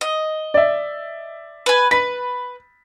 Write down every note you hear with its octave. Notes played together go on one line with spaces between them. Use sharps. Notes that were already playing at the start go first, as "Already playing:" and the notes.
D#5
D5 E5
B4 G#5
B4 B6